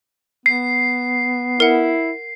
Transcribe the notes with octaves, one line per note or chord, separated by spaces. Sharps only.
B3 C7
E4 A#4 F#5